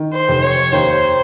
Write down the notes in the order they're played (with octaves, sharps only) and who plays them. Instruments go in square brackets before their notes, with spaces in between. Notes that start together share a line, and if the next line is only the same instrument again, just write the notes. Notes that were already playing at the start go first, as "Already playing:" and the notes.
Already playing: [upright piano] D#3
[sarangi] C5
[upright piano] F1
[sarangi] C#5
[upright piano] D#2 [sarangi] C5